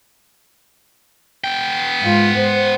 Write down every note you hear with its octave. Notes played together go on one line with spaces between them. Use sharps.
B3 G5
G#2 F4
C5